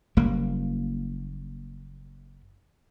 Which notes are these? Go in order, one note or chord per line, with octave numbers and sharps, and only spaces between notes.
F#1 G3 A#3